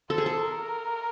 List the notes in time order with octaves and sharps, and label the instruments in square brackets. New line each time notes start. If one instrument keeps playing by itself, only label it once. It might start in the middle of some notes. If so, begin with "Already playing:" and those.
[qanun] A4 [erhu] C5
[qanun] G#4
A4
[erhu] A#4